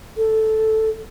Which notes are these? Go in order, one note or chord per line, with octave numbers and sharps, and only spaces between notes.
A4